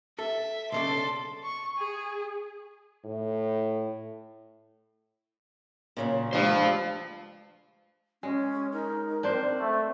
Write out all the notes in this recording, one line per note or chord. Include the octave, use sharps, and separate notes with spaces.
A4 E5
B1 C#3 D4 A4 C6
C#6
G#4
A2
A#2 C#3 F#3
G2 G#3 C5 F5
G#3 C#4
D#4 A#4
C4 D4 C5
A3